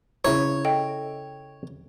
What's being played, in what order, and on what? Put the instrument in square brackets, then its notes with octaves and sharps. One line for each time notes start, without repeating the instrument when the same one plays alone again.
[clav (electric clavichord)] C#3 E4 A#5 [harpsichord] C#5
[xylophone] A4 D#5 G5